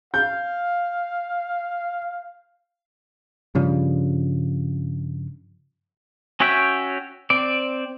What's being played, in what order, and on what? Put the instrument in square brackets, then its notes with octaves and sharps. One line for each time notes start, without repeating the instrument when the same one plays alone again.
[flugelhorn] F5 [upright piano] G6
[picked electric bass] G2 C#3 F3 G3
[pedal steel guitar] C#4 F#4 C#5 E5 G5
C4 D5